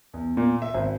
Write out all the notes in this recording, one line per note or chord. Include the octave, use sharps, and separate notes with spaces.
E2
A#2
E5
G#1